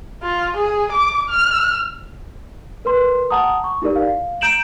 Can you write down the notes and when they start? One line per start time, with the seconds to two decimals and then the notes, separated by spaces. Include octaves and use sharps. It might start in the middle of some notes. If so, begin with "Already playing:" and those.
0.23 F4
0.57 G#4
0.92 D6
1.29 F6
2.85 A#4 B4 C6
3.30 F#5 A5 A#5 D#6
3.64 C#6
3.82 D#4 E4 G4 A#4 D5
3.96 F5
4.41 A#5 G6 D7 E7 F#7